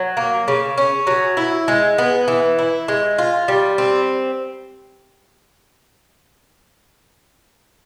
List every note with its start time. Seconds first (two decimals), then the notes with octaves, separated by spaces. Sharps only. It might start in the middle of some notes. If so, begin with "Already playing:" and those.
Already playing: F#3
0.17 A#3
0.48 C#3
0.78 C#4
1.07 F#3
1.37 E4
1.68 G#3
1.98 B3
2.28 E3
2.59 E4
2.88 G#3
3.18 F4
3.48 G3
3.78 C4